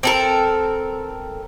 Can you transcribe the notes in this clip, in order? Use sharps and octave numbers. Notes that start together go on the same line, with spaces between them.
C4 A4 A#4